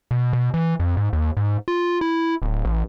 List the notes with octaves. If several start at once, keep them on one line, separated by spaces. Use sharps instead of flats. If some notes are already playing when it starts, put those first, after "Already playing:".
B2
B2
E3
F2
G#2
D#2
G#2
F4
E4
D1
A1